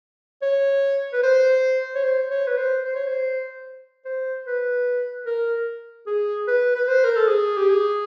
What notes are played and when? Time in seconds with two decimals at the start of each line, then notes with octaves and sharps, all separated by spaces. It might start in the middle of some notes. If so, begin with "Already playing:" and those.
0.42 C#5
1.13 B4
1.23 C5
1.95 C#5
2.03 C5
2.31 C#5
2.47 B4
2.58 C5
2.85 C5
2.95 C#5
3.07 C5
4.05 C5
4.46 B4
5.26 A#4
6.07 G#4
6.48 B4
6.76 B4
6.88 C5
7.04 A#4
7.16 A4
7.28 G#4
7.57 G4
7.69 G#4